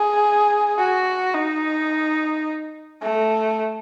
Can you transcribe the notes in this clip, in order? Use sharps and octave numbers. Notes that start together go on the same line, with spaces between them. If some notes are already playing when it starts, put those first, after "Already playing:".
Already playing: G#4
F#4
D#4
A3